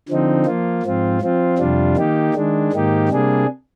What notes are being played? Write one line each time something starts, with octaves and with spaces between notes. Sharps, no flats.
D3 F3 C4 D#4
F3 A#3 F4
G#2 F3 C4 F4
F3 C4 F4
F2 C3 G3 D4 F4
D#3 A#3 D#4 G4
D#3 G#3 D4
G#2 D#3 A#3 D#4 G4
C3 G3 A#3 D4 G#4